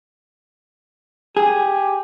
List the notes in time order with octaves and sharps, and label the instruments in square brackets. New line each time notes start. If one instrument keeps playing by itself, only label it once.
[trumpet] G4 [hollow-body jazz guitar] G#4